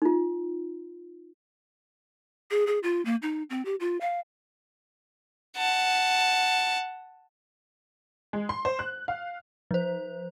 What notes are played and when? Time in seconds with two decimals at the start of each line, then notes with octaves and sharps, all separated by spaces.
0.02 D#4 F4
2.51 G#4
2.67 G#4
2.83 F4
3.05 A#3
3.22 D#4
3.50 C4
3.65 G4
3.80 F4
4.01 F5
5.57 F#5 A5
8.33 G#3
8.49 C6
8.65 C5
8.79 F#6
9.08 F5
9.71 F3 C5